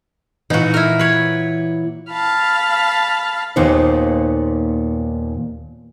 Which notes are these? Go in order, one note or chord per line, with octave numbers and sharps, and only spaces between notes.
A#2 E3 D#4 F#4
E4 A#4
B4 C#5
F5 A5 B5
D#2 A#2 B3 D#4 C5